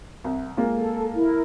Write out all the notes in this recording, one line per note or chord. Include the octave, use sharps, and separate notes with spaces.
C2
G#3 A#3 F4
A4
E4 A#4